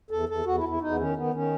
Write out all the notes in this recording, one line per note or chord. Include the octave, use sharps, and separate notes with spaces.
E2 A4
E2 A4
E2 F#4
E4
E2
E4
E2 D#4
B3
D#3 C#4
D#3 B3
D#3 C#4